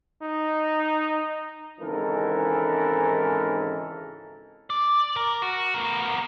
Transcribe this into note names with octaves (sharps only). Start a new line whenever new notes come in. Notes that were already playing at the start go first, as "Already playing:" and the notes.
D#4
G#1 G#2 C#3 E3 A4 A#4
D5
A#4
F#4
B3 A#4